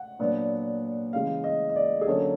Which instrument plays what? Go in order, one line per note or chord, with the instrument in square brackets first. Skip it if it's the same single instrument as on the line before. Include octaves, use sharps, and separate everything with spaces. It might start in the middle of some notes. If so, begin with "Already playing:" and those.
Already playing: [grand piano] F#5
A#2 F#3 B3 D4
C#3 E3 G#3 F5
D#5
D#5
D5
G#4
D3 F#3 A#3 C#4 A4